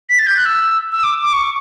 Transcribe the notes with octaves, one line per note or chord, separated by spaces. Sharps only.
B6
A6
G6
F#6
E6
E6
D6
D6
C#6